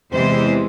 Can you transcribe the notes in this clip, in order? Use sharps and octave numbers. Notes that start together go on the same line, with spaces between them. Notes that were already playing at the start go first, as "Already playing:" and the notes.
E2 C3 E3 G#3 C5